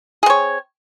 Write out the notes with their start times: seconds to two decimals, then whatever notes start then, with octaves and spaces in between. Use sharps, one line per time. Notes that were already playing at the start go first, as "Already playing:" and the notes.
0.23 G#4
0.26 C4
0.30 C#5